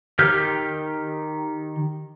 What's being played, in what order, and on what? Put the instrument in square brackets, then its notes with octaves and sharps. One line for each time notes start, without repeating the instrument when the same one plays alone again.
[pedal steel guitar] D#3 G4 F6 G6